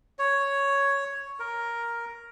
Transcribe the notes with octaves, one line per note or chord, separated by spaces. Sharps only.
C#5
A#4